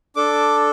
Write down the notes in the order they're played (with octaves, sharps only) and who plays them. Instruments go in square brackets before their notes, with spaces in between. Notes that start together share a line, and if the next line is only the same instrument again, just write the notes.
[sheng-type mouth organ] D4 A4 D6